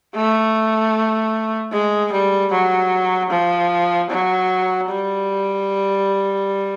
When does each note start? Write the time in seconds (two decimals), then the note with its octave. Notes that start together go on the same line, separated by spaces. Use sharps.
0.15 A3
1.72 G#3
2.12 G3
2.52 F#3
3.30 F3
4.10 F#3
4.89 G3